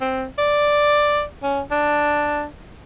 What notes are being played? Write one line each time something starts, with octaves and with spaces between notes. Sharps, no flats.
C4
D5
C#4
D4